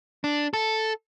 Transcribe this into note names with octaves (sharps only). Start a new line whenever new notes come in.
D4
A4